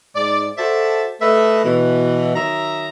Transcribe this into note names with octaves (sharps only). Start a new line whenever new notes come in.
G#2 D5
F#4 A4 C5 D5 E5 A5
A3 A4 B4 D#5 E5
B2 E3
D#3 F#3 E5 A#5